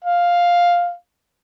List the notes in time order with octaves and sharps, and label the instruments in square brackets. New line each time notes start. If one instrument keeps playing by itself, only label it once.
[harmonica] F5